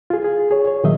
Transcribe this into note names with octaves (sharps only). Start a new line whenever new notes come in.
F4 G#4
G#4
G#4 C#5
C#5
A#2 D#3 F#3 D#4 D#5 E5